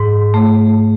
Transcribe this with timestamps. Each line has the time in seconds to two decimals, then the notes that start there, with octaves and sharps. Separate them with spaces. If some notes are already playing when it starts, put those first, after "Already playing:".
Already playing: G#2
0.34 A3